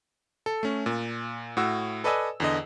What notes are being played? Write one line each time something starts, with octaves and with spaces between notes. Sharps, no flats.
A4
A3 C#4
A#2
A2 F#4 E6
A4 B4 D5 D#5 G#5 E6
E2 D3 D#5